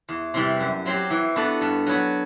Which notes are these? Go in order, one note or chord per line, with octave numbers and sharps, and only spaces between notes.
E2
C3 E3 G3
F#2
F#3 C4 G4
E3
B3 D4 F#4 A4
G2
F#3 B3 F#4